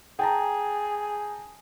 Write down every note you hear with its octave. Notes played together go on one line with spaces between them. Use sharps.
G#4 G5 A5 A#5